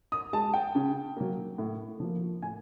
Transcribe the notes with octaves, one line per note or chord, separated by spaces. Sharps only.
D#6
G#3 A5
G5
C#3
F#3 A#3
A2
F3 A#3
A2 G#5